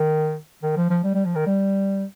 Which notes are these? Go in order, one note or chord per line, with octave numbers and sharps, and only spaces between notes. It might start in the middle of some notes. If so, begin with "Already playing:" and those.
Already playing: D#3
D#3
F3
F3
G3
G3
F3
D#3
G3